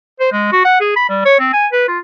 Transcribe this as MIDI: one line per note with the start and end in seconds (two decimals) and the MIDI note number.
0.20 0.30 72
0.32 0.52 56
0.52 0.61 66
0.65 0.80 78
0.80 0.95 68
0.96 1.05 83
1.09 1.25 55
1.25 1.38 73
1.40 1.48 60
1.53 1.67 80
1.72 1.86 71
1.88 1.98 65